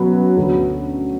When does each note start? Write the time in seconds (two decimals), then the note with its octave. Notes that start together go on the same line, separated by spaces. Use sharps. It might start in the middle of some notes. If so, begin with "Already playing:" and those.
Already playing: B2 F#3 C#4 F#4 B4
0.37 D2 D3 A3 C#4 F#4